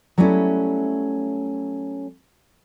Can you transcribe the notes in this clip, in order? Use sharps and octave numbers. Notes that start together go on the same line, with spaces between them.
F#3 G3 A3 B3 C#4 E4